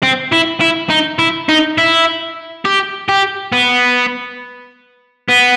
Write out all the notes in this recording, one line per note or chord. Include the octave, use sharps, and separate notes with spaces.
C4
E4
E4
D#4
E4
D#4
E4
G4
G4
B3
B3